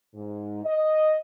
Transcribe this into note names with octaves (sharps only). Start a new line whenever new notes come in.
G#2
D#5